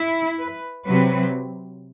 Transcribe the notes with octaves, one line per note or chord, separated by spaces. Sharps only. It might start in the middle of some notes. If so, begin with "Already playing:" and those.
Already playing: E4
B4
C3 F#3 C4 B4